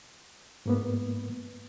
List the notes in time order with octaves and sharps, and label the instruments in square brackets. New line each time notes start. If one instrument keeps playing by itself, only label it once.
[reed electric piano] G#2 A#3 B3